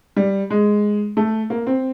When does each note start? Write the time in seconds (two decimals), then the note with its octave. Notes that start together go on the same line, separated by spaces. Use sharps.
0.16 G3
0.50 G#3
1.17 A3
1.50 A#3
1.67 C4